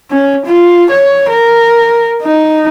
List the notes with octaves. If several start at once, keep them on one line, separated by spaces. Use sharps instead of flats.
C#4
F4
C#5
A#4
D#4